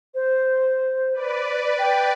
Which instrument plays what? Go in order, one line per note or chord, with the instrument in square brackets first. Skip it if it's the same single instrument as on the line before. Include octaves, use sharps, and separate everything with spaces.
[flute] C5
[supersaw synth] B4 D5
[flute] G5